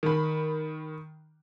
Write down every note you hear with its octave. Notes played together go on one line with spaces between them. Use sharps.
D#3 B5